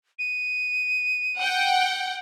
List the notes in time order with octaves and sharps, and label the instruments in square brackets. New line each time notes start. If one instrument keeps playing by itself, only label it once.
[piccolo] D#7
[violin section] F#5 G5